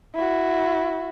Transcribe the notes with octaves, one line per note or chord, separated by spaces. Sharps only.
E4 F#4